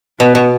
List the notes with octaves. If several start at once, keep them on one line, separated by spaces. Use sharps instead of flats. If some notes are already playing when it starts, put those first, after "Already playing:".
B2 B3
B2